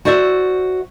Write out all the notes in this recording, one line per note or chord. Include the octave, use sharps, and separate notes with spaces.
F#4 C5 D5 E5